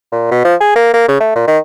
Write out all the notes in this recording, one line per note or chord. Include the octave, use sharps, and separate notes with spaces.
A#2
B2
F3
G#4
A#3
A#3
C#3
A3
A#2
D#3